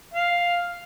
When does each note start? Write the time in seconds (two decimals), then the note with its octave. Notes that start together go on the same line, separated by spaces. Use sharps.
0.14 F5